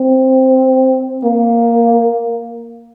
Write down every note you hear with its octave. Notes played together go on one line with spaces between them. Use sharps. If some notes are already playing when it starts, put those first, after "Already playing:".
Already playing: C4
A#3